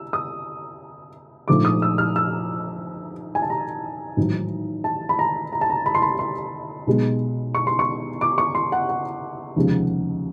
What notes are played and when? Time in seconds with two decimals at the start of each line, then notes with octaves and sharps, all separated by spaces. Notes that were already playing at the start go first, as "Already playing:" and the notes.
Already playing: E6
0.13 D#6
1.48 A#1 G#2 F3 A3 D6
1.65 D#6
1.82 E6
1.98 F6
2.16 E6
3.35 G#5
3.42 A5
3.50 A#5
4.17 A1 G#2 D#3 F#3
4.84 A5
5.09 B5
5.19 A#5
5.53 A#5
5.61 A5
5.70 A#5
5.86 B5
5.95 C6
6.02 B5
6.19 C6
6.87 B1 B2 G#3
7.55 C#6
7.67 C6
7.79 C#6
8.21 D6
8.38 C#6
8.55 C6
8.72 F#5
8.89 F#5
9.56 F1 D#2 C#3 F3 G#3